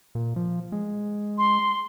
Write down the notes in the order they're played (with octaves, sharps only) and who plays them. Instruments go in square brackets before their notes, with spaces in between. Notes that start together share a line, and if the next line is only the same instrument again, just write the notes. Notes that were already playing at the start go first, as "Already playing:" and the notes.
[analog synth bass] A#2
F3
G#3
[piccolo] C6